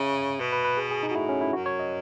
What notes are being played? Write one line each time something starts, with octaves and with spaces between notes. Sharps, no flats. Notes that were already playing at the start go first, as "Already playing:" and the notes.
Already playing: C#3 E5
B2 B4
B4
B4
G#4
G#4
D#4
B2
F#4
A2 E4
C#4
E4
F#2 F#4
C#5
D#5